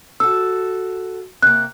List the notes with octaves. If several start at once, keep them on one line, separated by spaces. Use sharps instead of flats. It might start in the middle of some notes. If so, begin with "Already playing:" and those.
F#4 A4 E6
C3 A#3 F#6